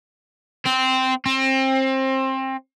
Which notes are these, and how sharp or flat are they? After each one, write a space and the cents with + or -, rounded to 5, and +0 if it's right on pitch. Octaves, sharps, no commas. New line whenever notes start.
C4 -10
C4 +25